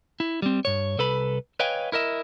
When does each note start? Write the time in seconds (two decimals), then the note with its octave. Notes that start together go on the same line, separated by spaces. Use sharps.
0.20 E4
0.42 G3 C4
0.65 G2 C#5
0.98 C2 A4 B4 B5
1.60 B4 C#5 D#5 F5 G5 G#5
1.92 E4 A#4 D#5 E5